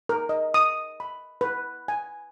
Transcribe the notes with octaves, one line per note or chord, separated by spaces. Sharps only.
A#4
D#5
D#6
B5
B4
G#5